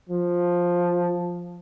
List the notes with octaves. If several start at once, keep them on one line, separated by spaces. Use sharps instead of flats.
F3